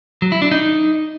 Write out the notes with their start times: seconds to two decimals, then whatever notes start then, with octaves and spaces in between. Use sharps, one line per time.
0.22 F#3
0.32 E4
0.42 D4
0.51 D#4